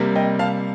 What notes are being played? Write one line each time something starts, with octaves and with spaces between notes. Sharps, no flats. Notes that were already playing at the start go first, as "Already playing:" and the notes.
Already playing: C3 G3 A#3
D#5 G5
F5 A5